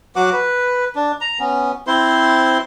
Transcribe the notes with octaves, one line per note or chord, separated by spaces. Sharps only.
F#3 F#4 F#5 D6
B4
D4
A#5
B3 C#4
C4 E4 C5 C6